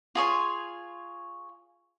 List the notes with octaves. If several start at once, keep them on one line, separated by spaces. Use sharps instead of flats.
F4 G#4 C#5 C6